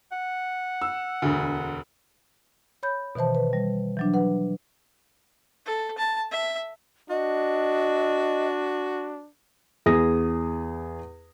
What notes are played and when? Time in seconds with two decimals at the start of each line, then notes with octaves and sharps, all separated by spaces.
0.12 F#5
0.82 E6
1.22 E1 D2
2.83 C#5 B5 G6
3.15 B2 D#3 E3 C5 A5
3.35 B4
3.53 G3
3.97 E3 F#3 D4
4.14 B4 F#5
5.66 A4
5.98 A5
6.31 E5
7.10 D4 F#4 D#5
9.86 E2 G#4 D#6 A#6